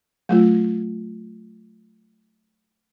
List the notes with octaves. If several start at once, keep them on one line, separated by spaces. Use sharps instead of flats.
F#3 A3 F4